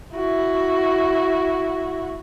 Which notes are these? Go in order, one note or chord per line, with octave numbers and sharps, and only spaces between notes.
E4 F#4